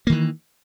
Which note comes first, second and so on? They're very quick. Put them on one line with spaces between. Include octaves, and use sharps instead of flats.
A#3 D#3 E3